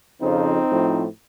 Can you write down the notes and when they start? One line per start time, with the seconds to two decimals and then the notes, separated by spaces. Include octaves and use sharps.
0.21 F2 C#3 F3 C4 D#4
0.69 A2 F3